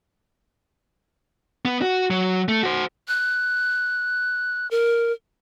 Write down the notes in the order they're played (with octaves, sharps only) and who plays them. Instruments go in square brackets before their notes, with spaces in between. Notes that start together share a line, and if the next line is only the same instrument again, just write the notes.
[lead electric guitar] B3
F#4
F#3
A3
F#4 C5
[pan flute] F#6
A#4